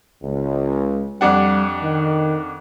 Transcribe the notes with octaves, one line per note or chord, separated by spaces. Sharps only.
C#2
F2 G3 D4 F#5
D#3